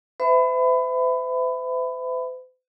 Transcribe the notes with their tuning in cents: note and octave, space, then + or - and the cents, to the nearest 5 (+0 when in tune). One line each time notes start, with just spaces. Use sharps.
C5 -45 E5 +0 B5 +25